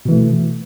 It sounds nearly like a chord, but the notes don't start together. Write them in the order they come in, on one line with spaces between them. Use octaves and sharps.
B2 E3 A3